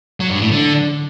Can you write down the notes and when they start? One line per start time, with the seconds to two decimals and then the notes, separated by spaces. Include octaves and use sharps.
0.20 F#3
0.31 G2
0.41 A2
0.51 D3